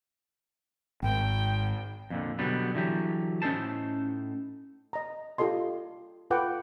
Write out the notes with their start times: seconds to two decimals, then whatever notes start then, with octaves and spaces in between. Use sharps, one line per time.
1.02 G#1 G#2 G5
2.10 F2 A#2 D3
2.39 B2 D3 F#3 G3 B3
2.75 D3 E3 F#3 G4
3.42 A2 C#4 D#4 A4 C5 A5
4.93 D#5 A#5
5.38 F4 G4 A4 D#5 C6
6.30 F4 A4 B4 F#5 G5 D6